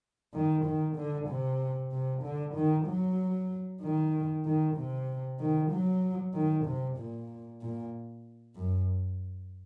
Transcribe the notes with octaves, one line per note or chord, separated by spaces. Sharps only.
D#3
D#3
D3
C3
C3
D3
D#3
F#3
D#3
D#3
C3
D#3
F#3
D#3
C3
A#2
A#2
F#2